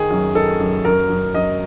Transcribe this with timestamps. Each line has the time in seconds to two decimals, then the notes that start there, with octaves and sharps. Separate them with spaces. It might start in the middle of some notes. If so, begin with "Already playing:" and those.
Already playing: D#3 G#4
0.11 F#2
0.35 D#3 A4
0.60 F#2
0.85 F#2 A#4
1.10 F#2
1.34 F#2 D#5